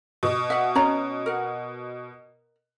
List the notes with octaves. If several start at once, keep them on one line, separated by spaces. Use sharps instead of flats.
B2
E5 F#5
C#4 C#5 A#5
A#4 F#5